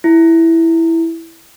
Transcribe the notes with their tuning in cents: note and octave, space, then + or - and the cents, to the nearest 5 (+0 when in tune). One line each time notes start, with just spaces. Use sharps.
E4 +0